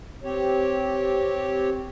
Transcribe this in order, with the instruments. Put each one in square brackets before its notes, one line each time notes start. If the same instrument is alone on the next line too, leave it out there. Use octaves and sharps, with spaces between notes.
[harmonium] C4 G4 C#5